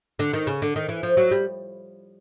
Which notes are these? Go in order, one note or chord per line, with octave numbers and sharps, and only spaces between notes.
D3
D#3
C#3
D3
D#3
E3
F3
F#3
G3